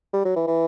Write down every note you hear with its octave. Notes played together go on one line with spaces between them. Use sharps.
G3
F#3
E3
E3